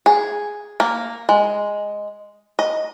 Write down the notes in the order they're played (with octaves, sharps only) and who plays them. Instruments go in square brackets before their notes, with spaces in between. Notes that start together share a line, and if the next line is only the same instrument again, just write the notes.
[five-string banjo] G#4
A#3
G#3
D#5